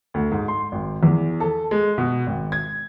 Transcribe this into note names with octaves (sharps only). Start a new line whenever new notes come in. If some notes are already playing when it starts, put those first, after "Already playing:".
D2
G#2
C6
G#1
E2
A4
G#3
B2
G#1
G#6